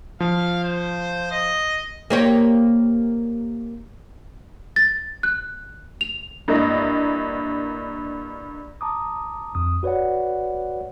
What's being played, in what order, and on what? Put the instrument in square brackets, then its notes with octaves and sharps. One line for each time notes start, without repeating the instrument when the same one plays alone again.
[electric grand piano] F3 [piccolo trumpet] F5
[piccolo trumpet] C5
D#5
[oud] A#3 G4 C#5
[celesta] A6
F#6
F7
[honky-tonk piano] G2 A#3 E4 D#5
[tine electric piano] A5 A#5 D6 D#6
F2 D#6
F#4 B4 C#5 D5 F#5